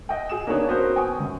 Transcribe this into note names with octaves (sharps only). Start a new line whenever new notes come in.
D#5 E5 F#5 G5
G#4 D#6 E7
A#3 B3 D4 D#4 G#4 C#5
B3 C#4 F#4 A#4 C5
G5 G#5 C#6 D#6
F#2